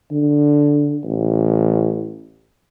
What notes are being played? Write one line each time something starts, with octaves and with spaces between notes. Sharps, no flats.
D3
A1